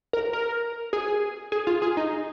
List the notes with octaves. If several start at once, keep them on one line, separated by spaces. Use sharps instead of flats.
A#4
A#4
G#4
G#4
F4
G#4
D#4